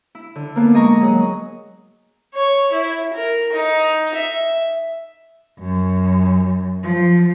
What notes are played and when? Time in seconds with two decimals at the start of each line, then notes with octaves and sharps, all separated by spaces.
0.15 E4
0.36 D3
0.56 A#3 B3 D4
0.74 G#3 D#5 A#5 C#6
1.01 F#3 G#4
2.34 C#5
2.72 E4
3.14 A#4
3.53 D#4
4.15 E5
5.59 F#2
6.83 F3